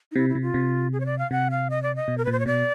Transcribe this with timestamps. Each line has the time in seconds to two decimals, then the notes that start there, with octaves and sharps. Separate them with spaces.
0.12 D#4
0.16 C3 E4
0.29 E4
0.35 C3
0.42 F4
0.54 C3
0.93 G#4
1.00 C#5
1.06 D5
1.19 F5
1.31 C3 F#5
1.51 F5
1.70 D#5
1.83 D5
1.96 D#5
2.08 B2
2.18 A#4
2.25 A#2 B4
2.32 C5
2.39 C#5
2.46 B2 D5